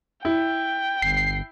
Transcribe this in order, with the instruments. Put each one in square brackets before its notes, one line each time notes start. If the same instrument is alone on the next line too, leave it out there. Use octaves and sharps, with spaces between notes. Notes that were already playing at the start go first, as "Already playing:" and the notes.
[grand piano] E4 [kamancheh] G5
[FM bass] G1 [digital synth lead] C7